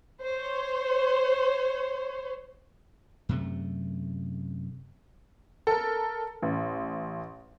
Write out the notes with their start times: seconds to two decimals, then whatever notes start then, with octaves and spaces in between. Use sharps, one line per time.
0.22 C5 C#5
3.29 F#2 C3 A3
5.67 A4 A#4
6.42 A1